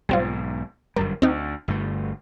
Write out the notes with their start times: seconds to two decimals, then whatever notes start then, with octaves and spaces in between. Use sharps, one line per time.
0.09 B1 G#2 G3 C4 F4
0.96 G1 F#2 G3 A#4
1.22 D2 C4 D#4
1.68 G1 G2 A3